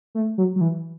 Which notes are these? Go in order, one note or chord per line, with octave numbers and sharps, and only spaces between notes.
A3
F#3
F#3
E3